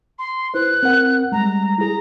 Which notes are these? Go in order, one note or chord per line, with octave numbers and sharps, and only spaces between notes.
C6
E4 B4 C5 F#6
C4 A#4 F#5
G3 G#3 A#5
E4 G#4 A#5